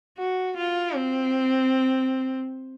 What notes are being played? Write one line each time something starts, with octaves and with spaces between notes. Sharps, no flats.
F#4
F4
C4